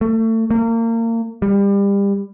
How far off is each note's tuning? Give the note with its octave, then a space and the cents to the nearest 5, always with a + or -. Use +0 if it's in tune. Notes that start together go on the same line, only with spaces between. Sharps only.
A3 +30
A#3 -30
G3 +30